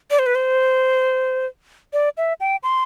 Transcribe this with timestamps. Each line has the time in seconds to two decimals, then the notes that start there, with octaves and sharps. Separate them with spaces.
0.11 D5
0.19 C5
0.26 B4
0.35 C5
1.93 D5
2.17 E5
2.40 G5
2.63 C6